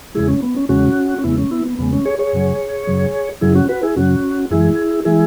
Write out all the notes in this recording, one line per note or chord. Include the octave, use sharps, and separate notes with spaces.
E2 C#3 G#3 E4 G#4
C#4
B3
C#4
E2 C#3 G#3 C#4 F#4
C#4
E2 C#3 G#3 B3 E4
C#4
B3 E4
B3
E2 C#3 G#3 B3
C#4
G#4 C#5
G#4 C#5
F#2 C#3 F#3
F#2 C#3 F#3
F#2 C#3 F#3 E4 G#4
C#4 F#4
F#4 B4
E4 G#4
F#2 C#3 F#3 C#4 F#4
F#2 E3 G#3 E4 G#4
E3 G#3 E4 G#4